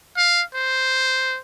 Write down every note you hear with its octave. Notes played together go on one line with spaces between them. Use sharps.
F5
C5